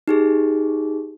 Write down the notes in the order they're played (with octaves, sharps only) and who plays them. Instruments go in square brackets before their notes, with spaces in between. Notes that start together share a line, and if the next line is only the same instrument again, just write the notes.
[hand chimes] D#4 G4 G#4